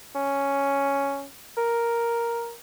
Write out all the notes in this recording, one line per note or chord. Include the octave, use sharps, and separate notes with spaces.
C#4
A#4